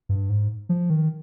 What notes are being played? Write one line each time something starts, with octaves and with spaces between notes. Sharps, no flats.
G2
G#2
F3
D#3